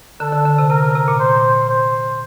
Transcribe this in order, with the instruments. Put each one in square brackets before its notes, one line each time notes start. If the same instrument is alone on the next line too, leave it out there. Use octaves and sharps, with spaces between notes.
[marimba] D3 [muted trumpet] A4
[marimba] D3
D3
C3
[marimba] C3 [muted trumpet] A#4
[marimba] C3
C3
A#2
[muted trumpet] C5
C5